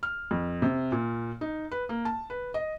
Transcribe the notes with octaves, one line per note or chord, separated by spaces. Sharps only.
F6
F2
C3
A#2
D#4
B4
A#3
A5
B4
D#5